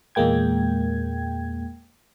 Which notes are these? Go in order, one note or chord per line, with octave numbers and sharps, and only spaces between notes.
E2 A#2 G#3 A#3 G5 G#6